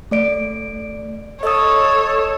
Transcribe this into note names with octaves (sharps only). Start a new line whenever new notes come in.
A3 D5 D7
A4 C#5 D#5 D#6